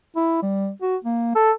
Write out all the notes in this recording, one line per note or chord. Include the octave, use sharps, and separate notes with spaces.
E4
G3
F#4
A#3
A4